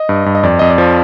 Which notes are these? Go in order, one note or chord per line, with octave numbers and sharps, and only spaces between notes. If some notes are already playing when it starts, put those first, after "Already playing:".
Already playing: D#5
G2
G2
D#5
F2 D5
F2 D#5
D5
F3